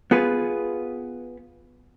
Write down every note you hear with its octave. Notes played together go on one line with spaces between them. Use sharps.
B3 F4 G#4 B4